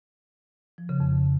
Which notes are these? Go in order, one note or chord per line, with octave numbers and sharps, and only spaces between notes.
F3
C#3
F2